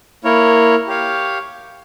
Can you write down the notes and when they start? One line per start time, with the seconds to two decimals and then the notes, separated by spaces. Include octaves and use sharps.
0.24 A#3 E4 A#4 C#5
0.87 G4 C#5 F5